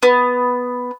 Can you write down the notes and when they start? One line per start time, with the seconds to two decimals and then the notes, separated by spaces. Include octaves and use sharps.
0.03 B3